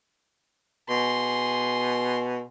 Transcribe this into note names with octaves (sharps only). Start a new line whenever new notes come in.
B2 G#4 C6